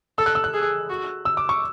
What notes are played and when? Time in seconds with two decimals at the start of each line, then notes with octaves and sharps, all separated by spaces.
0.18 A4 E6
0.26 F#6
0.35 E6
0.44 F#6
0.53 G#4
0.90 F#4
1.25 E6
1.37 D6
1.49 C#6